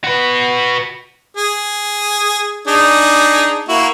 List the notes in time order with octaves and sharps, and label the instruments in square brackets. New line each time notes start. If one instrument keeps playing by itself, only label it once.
[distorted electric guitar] F#4 B4
[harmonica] G#4
D4 D#4 G#4
A#3 E4 F#4